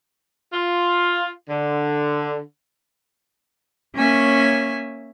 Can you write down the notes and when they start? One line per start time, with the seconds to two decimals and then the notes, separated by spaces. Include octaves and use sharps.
0.52 F4
1.49 D3
3.96 A#3 C#4 C#5 E5 G#5